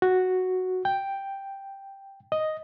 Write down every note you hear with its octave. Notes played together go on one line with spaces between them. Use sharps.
F#4
G5
D#5